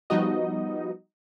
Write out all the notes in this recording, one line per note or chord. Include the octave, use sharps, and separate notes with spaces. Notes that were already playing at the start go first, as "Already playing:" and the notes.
F3 G3 B3 D#4 F#4 D#5